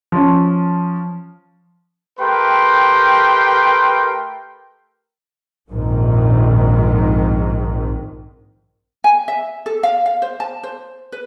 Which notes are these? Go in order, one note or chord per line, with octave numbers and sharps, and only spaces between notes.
F3 C#4
A3 G4 A#4 B4 G5 C6
A#1 F2 G#2 D#3
G#5
E5
A4
F5
F5
C5
A5
C5
B4